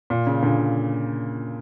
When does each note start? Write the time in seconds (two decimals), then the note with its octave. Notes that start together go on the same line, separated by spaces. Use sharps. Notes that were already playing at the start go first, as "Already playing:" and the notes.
0.10 A#2
0.27 C#3
0.42 A#2 D3